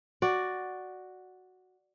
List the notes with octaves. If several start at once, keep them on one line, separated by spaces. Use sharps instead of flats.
F#4 D5